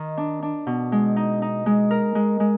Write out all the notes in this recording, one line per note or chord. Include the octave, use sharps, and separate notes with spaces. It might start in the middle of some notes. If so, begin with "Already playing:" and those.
Already playing: D#3
D4
D4
B2
G#3
D#4
D#4
G#3
A#4
G#3
G#3